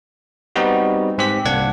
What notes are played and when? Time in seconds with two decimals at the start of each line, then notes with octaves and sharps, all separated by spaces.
0.56 G3 B3 C4 D#4 F#4
1.18 G#2 C4 G4 B6
1.45 C2 A#3 D4 F#5 G#6